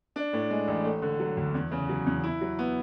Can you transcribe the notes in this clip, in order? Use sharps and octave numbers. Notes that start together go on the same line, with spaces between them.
D4
A2
G#3
A1
A3
D3
F#3
D2
E2
C#3
F#3
E2
E4
F#3
B3